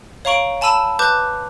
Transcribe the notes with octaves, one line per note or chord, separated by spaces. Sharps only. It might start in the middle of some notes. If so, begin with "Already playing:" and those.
C#5 F5 A#5 C#6 D7 F#7
G#5 A5 B5 E6 D#7 E7
B4 A5 D6 F#6 G6